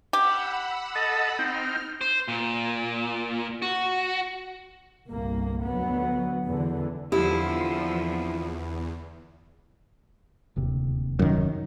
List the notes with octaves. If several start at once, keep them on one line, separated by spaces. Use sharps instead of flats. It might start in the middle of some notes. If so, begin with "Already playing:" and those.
G4 F#5 B5 E6
A4 D#5 A5
C4 D#4 G5 F6
C5
A#2
F#4
G1 C2 A#3
D2 F#3 B3
E2 D3 E3
E2 D3 F3 C4 E4 G4
D1 D#2 C3
F#2 D#3